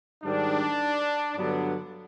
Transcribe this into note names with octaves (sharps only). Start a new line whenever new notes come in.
G#2 D#3 G3 D4
G2 D3 F#3 B3 D4